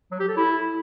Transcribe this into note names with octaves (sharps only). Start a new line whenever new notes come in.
F#3
G4
A4
E4